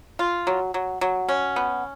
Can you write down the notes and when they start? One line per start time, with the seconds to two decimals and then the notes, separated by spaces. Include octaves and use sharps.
0.19 F4
0.47 F#3
0.74 F#3
1.01 F#3
1.29 C#4
1.56 B3